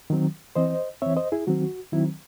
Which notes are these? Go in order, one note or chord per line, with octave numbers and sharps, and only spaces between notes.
D#3 F#3 C4
E3 C4 C5 D#5
E3 C4 C#5 E5
C5 D#5
E4 G#4
D#3 F#3 C4 F#4
D#3 F#3 C4 E4